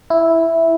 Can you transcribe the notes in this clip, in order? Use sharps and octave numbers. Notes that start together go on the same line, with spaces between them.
E4